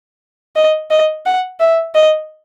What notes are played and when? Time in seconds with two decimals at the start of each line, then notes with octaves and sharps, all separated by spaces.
0.56 D#5
0.91 D#5
1.26 F#5
1.60 E5
1.95 D#5